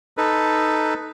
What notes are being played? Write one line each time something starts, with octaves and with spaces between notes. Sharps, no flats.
D#4 A4 B4